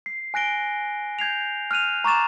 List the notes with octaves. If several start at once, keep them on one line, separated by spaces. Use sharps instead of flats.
C7
G#5 F#6 A#6 D7 G7
G6 G#6 C7 F7
F6 F#6 D#7 F7
A#5 C#6 D6 A6 E7